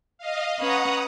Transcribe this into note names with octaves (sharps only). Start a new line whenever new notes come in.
D#5 F5
C#4 B4 C#5 F#5 A#5 D#6